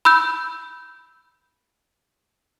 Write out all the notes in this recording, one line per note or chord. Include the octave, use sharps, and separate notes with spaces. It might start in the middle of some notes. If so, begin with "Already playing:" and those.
B5 E6 G6